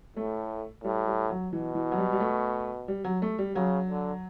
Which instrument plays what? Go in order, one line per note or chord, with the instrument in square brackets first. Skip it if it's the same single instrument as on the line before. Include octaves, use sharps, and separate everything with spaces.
[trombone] A2 [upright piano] A3
[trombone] A2 [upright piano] G3
[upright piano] G3
F#3
[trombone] B2 [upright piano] E3
[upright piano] E3
F#3
G3
G3
A3
G3
F#3
A3
G3
[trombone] C#3 [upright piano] F#3
[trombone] D3